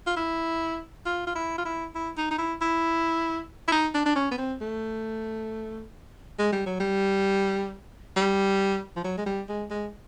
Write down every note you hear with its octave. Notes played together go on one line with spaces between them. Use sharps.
F4
E4
F4
F4
E4
F4
E4
E4
D#4
D#4
E4
E4
E4
D#4
D4
D4
C#4
B3
C4
A3
G#3
G3
F#3
G3
G3
F3
F#3
G#3
G3
G#3
G#3